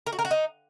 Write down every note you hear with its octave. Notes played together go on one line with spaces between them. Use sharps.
A#4
F#4
A#4
F#4
D#4